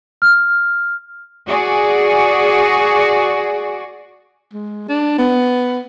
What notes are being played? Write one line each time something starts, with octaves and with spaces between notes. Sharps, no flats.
F6
F#4 G#4 D5
G#3
D4
B3